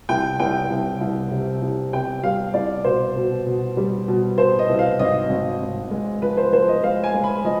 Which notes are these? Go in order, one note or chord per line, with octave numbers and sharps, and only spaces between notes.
C2 G5
C2 G5
C2
C2
C3
C2
C3 G5
G3 F5
C2 D5
B2 C5
B2
B2
G3
B2
B2 C5
D#5
C2
F5
G#1 D#5
G#1
G#1
G#3
F3 B4
C5
F3 C5
D#5
G#3 F5
G#5
G#3
B5
F3 D#5